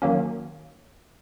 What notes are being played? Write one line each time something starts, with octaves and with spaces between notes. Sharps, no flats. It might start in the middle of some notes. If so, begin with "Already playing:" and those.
D#3 F#3 A#3 C#4